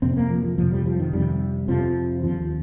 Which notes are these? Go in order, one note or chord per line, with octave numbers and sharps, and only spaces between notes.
F2 C3 C4
A#3
F3
F3
F2 C3 F3
G3
F3
D#3
F2 C3 G3
F2 C3 F3
D#2 F3